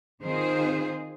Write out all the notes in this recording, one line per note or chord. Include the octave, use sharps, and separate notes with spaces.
D#3 C4 D#4 F4 G#4 C5